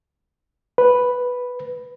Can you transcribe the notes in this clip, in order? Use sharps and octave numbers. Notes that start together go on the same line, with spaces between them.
B4